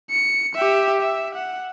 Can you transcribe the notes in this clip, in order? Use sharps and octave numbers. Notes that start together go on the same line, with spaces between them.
C#7
G4 E5
E5
F#5